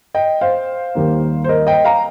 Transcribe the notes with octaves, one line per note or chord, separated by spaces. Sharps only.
D#5 G5
C5 F5
D#2 D#3 G3 A#3
C5
A#4 D#5
D#5 G5
F5 A#5